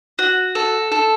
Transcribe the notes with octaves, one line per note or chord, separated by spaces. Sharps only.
F#4
A4
A4